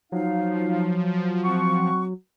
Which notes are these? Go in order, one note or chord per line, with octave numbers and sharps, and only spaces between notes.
F3 F#3 D#4 F5
C4 F#5 C#6